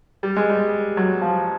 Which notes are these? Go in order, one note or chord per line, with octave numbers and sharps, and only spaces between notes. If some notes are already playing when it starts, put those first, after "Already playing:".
G3
G#3
G3
F#3
F3